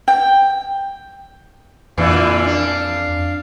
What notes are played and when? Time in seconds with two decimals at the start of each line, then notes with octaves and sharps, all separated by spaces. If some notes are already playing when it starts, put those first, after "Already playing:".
0.08 G5
1.98 F2 A#2 D3 E3 F5
2.46 D4